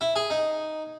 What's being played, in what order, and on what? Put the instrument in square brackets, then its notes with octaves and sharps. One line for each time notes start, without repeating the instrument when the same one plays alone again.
[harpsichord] E4
G#4
D#4